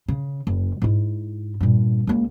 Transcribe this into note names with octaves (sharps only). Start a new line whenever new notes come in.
C#3
F#1
G#2 E4
G2 A#2
C#2 A#3